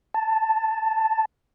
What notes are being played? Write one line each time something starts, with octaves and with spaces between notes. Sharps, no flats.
A5